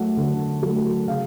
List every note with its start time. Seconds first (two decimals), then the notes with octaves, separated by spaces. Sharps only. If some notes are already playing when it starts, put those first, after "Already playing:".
Already playing: F#3 A3 F#5
0.17 D3
0.63 F#3 A3
1.08 C#3 F5